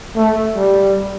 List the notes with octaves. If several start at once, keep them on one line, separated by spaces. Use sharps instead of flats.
A3
G3